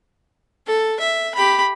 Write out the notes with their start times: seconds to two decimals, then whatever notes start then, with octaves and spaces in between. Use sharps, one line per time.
0.67 A4
1.00 E5
1.35 G4 B5